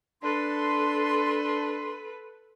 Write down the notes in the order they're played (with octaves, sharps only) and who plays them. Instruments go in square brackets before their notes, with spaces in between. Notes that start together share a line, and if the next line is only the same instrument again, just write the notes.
[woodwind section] D4 C6 [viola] A4 B4